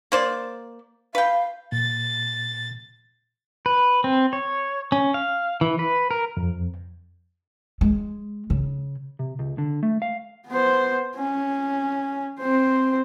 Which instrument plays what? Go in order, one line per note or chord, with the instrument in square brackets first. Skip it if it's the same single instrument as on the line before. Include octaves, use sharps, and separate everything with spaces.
[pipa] A#3 C5 D5
[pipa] B4 G5 [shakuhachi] F5
[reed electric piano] A#2 [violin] A6
[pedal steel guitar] B4
C4
C#5
C#4
F5
E3
B4
A#4
[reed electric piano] F2
[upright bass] G#3
C#3
[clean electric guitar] C3
C#2
D3
A3
F5
[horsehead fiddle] B3 C5
C#4
C4 C5